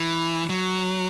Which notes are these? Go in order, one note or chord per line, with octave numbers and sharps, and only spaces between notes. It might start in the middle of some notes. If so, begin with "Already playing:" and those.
Already playing: E3
F#3